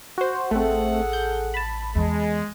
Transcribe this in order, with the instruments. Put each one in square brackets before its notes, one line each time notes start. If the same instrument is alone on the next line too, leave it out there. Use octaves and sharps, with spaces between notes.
[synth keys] F#4 C5
[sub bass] A1 [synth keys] A3 C4 [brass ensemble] G#4 A4 F#5
[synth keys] G6
A5 B5
[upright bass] E2 [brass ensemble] G#3